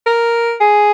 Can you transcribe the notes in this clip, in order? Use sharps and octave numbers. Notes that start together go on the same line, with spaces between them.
A#4
G#4